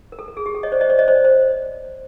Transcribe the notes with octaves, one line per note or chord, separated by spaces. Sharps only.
A#4
A4
A#4
G#4
G4
A4
C#5 D#5
C5 D5
C#5 D#5
C5 D5
C#5 D#5
C5 D5
C5